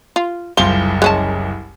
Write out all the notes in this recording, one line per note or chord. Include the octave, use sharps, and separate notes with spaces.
F4
F#1 C2 F3 G7
G#3 C#4 A5